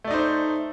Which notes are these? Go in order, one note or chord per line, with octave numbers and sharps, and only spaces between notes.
A3 D#4 C5 D5